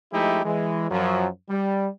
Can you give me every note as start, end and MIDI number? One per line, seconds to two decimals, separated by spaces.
0.13 0.44 53
0.13 0.44 56
0.13 0.44 57
0.13 0.44 63
0.13 0.44 64
0.13 0.44 67
0.45 0.88 52
0.45 0.88 56
0.91 1.27 42
0.91 1.27 53
0.91 1.27 54
1.50 1.88 55